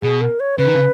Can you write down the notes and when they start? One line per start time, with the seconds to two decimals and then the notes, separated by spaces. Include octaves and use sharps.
0.02 B2 G#4
0.21 A#4
0.40 C#5
0.58 C#3 B4
0.66 D#3
0.74 C#3